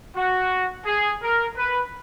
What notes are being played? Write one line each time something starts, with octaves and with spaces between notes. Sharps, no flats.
F#4
G#4
A#4
B4